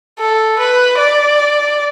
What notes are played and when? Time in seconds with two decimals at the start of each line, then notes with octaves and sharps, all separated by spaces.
0.19 A4
0.59 B4
0.98 D5